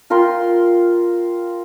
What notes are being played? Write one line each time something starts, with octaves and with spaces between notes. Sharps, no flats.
F4 A#4 G5 C6